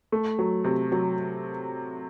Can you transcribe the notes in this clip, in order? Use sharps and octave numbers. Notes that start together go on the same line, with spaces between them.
A3
F#3
C3
F#3